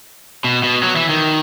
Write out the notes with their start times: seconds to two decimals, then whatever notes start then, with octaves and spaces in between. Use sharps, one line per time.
0.44 B2
0.64 B2
0.83 F#3
0.96 E3
1.09 D#3